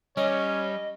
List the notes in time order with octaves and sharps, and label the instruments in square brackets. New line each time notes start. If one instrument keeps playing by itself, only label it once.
[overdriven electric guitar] G3 [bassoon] C#4 [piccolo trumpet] C#5 [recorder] D#5